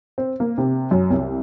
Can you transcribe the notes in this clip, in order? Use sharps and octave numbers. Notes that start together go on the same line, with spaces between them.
C4
A#3
C3
F#2
C2